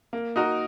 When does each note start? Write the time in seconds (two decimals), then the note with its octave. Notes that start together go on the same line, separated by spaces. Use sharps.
0.13 A#3
0.36 D#4 F#4 A#4